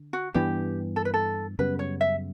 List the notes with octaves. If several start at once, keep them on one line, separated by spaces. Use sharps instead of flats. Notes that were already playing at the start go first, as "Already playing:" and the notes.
Already playing: D3
F#4
G2 E3 B3 D4 G4
A4
B4
A4
F#2 C#3 G3 B3 B4
C#5
E5